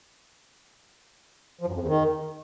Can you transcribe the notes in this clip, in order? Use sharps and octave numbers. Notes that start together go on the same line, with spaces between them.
F3
F#2
F2
E2
D#3